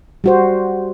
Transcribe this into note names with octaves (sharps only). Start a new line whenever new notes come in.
G3 F#4 C5